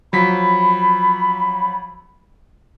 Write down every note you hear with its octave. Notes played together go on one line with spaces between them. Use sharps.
F3 F#3 B5 B6